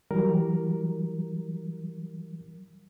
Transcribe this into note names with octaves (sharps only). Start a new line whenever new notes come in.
E3 F#3 G3 A#4